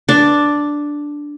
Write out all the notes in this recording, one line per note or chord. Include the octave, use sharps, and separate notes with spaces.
D4